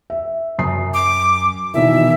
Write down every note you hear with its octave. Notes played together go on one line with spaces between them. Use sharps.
E5
F#2 D#6 C7
D6
B2 D#3 E3 E5